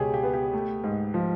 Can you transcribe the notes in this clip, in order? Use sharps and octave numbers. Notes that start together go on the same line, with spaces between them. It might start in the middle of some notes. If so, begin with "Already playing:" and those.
Already playing: C#2 B2 G4 G#4 C#5
G4
B3
G4
A3
G#2
F3